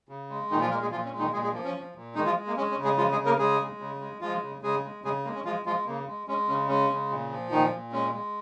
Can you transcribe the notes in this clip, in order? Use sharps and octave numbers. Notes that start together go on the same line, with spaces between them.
C#3
G#3
A#2 D#3 D#4
F3 F4
G#3 A#3 A#4
G#3 G#4
A#2 F3 F4
C#4
G#3
D#3 D#4
A#2 G#3 G#4
G#3 G#4
F3 A#3
C#4
F3
A#2
D#3 G#3 D#4
F3 F4
G#3
A#3
G#3 C#4
C#4
C#3
G#3 G#4
F3 G#3 F4
G#3 G#4
C#3
A#3 A#4
C#3 G#3 G#4
G#3
C#3
G#3
F3 G#3 F4
C#3
C#3 G#3 G#4
G#3
C#3 G#3 G#4
G#3 A#3
C#4
F3 G#3 F4
F3 G#3 F4
C#3 A#3
G#3
G#3 C#4
C#3 C#4
G#3 C#4
C#3
A#2
F3
A#2 D#3 D#4
A#2
G#3 C#4
G#3